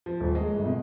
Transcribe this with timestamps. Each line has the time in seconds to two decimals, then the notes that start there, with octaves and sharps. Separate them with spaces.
0.06 F3
0.20 D#1
0.35 G#3
0.54 G1
0.66 B2